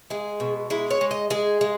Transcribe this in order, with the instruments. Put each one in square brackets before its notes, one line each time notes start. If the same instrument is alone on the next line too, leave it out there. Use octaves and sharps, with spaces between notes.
[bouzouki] G#3 G#4
B2
G#3 E4
C#5
G#3
D#5
G#3 G#4
G#3